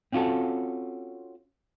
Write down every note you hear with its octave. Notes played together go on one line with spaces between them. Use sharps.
C4 C#4 F4 F#4 A4